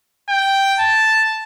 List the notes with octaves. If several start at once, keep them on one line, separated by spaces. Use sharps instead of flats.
G5
A5